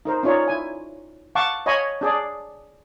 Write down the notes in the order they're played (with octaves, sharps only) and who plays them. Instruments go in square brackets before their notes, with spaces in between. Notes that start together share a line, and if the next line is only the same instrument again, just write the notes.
[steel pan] D#4 A#4 C5
C#4 D#4 F4 C#5 D5
E4 G#5
F5 F#5 A5 C#6 D6
C#5 D#5 F5 G#5 B5 C#6
D4 G#4 D5